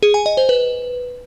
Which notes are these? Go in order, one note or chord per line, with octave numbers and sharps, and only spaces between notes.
G#4
G#5
D#5
C5
B4